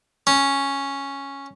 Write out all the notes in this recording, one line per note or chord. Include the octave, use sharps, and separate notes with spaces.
C#4